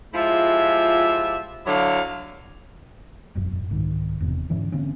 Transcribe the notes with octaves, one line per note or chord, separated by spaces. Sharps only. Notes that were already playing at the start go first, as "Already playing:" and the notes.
F3 G#3 E4 F4 G4 E5
D3 F#3 E4 C#5 D5 F5
E1 A1 F#2
C2 G#2 D#3
E1 E2 C3
G#2 D3 E3 C#4
D3 A#3 C4 C#4